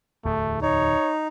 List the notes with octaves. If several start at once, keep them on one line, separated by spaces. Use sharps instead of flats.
D1 E2 A3
D#4 C#5